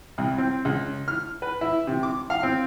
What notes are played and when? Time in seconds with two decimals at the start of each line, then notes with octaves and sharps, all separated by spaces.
0.18 C2
0.38 C4
0.65 C#2
1.08 F6
1.42 B4
1.61 E4
1.87 C3
2.03 D6
2.30 F5
2.43 C4